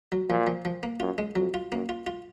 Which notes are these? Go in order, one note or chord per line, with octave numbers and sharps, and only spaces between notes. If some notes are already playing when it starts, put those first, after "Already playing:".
F#3
A#2 F3
F3
F3
A#3
F#2 F4
G#3
F2 F#3
F4
F#2 A#3
F4
F4